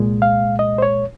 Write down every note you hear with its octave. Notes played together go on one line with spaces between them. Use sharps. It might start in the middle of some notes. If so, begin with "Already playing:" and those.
Already playing: C2 A#2 G#3
F5
D#5
C5
C#5